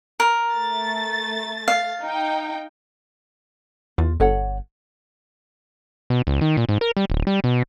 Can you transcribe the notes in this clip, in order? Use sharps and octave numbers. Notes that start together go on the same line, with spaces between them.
A#4
A3 A6
F5
D#4 G5
E2 F4
G1 A4 C#5 F#5
B2
C#2
D#3
A#2
G#2
A#4
G3
D1
G3
B2